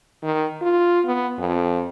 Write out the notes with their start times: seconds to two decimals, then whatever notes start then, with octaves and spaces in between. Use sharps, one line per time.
0.23 D#3
0.62 F4
1.06 B3
1.39 F2